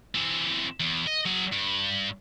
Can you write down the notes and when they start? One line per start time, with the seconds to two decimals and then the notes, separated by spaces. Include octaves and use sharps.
0.15 E3 C4
0.80 E2
1.07 D#5
1.26 F#3 G#4
1.53 G2